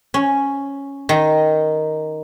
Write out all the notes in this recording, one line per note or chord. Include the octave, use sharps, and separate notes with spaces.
C#4
D#3